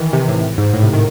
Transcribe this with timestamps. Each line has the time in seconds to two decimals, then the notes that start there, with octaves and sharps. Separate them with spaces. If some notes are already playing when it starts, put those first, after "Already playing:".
Already playing: D#3 E3
0.13 C3
0.28 A2
0.58 G#2
0.73 A2
0.83 C3
0.93 D#3